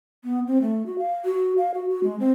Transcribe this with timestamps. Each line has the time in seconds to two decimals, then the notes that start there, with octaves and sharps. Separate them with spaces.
0.24 B3
0.47 C4
0.62 A3
0.86 F#4
0.98 F5
1.25 F#4
1.58 F5
1.74 F#4
1.89 F#4
2.04 G#3
2.20 C4